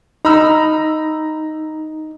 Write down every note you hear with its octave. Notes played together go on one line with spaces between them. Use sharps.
D#4 A#5 B5 E6